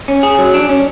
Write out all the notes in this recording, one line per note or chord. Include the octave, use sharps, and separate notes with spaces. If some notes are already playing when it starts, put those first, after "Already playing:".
C#4
G#4
F#3
D4
C#4